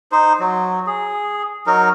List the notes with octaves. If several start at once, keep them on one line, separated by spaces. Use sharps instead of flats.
D#4 C5
F#3
G#4
F#3 D#4 A#4